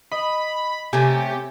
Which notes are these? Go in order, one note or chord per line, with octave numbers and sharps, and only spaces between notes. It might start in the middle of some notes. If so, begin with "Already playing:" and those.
D#5 B5
C3 A3 C#4 G4 G#5